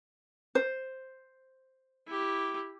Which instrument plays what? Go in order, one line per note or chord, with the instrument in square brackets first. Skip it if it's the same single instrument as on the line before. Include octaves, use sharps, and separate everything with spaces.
[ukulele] C5
[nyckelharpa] E4 G4